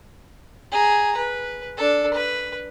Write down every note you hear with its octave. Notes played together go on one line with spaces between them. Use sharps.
G#4 A#5
B4
D4 A4
B4